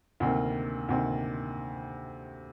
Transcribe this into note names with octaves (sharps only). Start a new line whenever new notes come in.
D2 C3 D#3 A#3
D2 C3 D#3 A#3